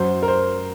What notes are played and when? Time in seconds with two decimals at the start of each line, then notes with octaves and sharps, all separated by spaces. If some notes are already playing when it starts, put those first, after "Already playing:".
Already playing: F#2 F#3 C5
0.23 A#4
0.28 C5